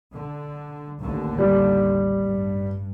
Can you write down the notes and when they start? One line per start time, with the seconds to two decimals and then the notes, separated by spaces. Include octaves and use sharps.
0.13 D3
1.00 A1 D#2 D3
1.38 G3
2.24 G2